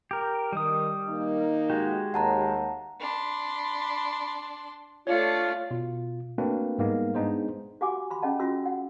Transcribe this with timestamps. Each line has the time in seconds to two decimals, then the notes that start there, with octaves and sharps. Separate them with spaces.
0.11 G4 A#4
0.52 D#3 G3 D#6
1.07 D#3 A#3 D#4
1.70 G#3 F#4 G4
2.14 D#2 F#5 A5 A#5
3.00 D4 B5 C6
5.07 A3 D4 F4 C#5 D5 C#7
5.71 B2 F4
6.38 A3 A#3 C4 D4 F#4 B4
6.78 G#2 G3 G#3 A#3 B3 D#4
7.15 G#3 B3 D4 D#4 G#4 C5
7.81 F#4 G4 F#5 G#5 D6
8.11 B5 C6
8.22 C#4 G#4 D#5 F#5 A5
8.40 C#4 F4 F#4 C6 E6
8.66 F#5